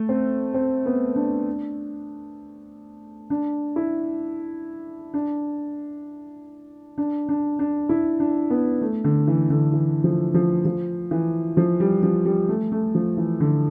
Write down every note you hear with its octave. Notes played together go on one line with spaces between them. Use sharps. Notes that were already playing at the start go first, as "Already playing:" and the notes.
Already playing: A3
C4
C4
B3
D4
D4
E4
D4
D4
D4
D4
E4
D4
B3
A3
D3
E3
D3
E3
F3
F3
F3
E3
F3
G3
F3
G3
A3
A3
F3
E3
D3